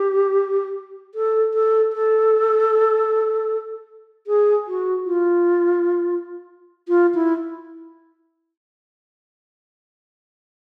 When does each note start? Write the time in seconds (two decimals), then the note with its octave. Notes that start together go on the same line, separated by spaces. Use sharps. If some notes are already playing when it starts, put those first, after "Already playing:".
Already playing: G4
1.15 A4
1.54 A4
1.93 A4
4.27 G#4
4.67 F#4
5.05 F4
6.88 F4
7.15 E4